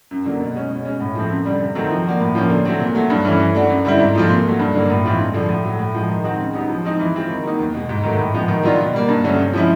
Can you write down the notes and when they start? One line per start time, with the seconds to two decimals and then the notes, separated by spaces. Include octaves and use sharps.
0.11 F#2
0.26 D3 F#3 A#3
0.40 B2
0.55 G#3 C#4
0.70 B2
0.85 G#3 C#4
1.00 A2
1.15 F3 A3 C4
1.30 F#2
1.45 D3 G3
1.61 C3
1.75 D#3 F#3 A3 C4
1.90 F3
2.05 A#3 D4 F#4
2.20 A2
2.35 F3 A#3 C#4
2.50 D3
2.65 F#3 A3 C4
2.80 A#2
2.95 F#3 A3
3.10 G2
3.25 E3 A3 C#4
3.40 E3
3.55 A3 D4 F#4
3.69 F#2
3.85 D3 G3 C4 E4
3.99 G#2
4.14 F3 A3 C4 F4
4.29 A#2
4.45 F#3 A3
4.59 G2
4.75 D3 F#3 A#3
4.90 A2
5.05 E3 G#3 C4 F4
5.20 G2
5.34 D3 F3
5.49 A2
5.64 F#3 A3
5.79 A2
5.94 F3 G#3
6.09 D#3
6.24 G#3 C4 D#4 F#4
6.40 C#3
6.54 F#3 B3 D#4 G4
6.69 F3
6.85 G#3 C4 D#4
6.99 E3
7.13 G#3 C4 F4
7.30 D#3
7.44 F#3 A#3 D#4
7.59 E2
7.74 B2 G#3
7.89 G#2
8.03 D#3 F#3 A3
8.19 A2
8.34 F3 G#3 B3
8.48 D#3
8.63 F#3 B3 D4 F4
8.79 B2
8.93 G3 A#3
9.09 G2
9.24 D3 F#3 A3 C#4
9.39 C3
9.53 F3 G#3 C#4 E4